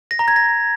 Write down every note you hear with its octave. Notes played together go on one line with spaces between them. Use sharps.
A#6
A#5
G#6
A#6